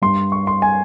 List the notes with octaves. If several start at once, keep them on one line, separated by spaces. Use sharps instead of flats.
G2 G3 C6
C#6
C6
G#5